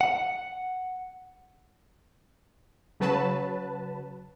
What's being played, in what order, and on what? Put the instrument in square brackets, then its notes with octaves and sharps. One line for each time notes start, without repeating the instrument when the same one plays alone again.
[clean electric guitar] F#5
[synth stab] C#3 F#3 B4 A5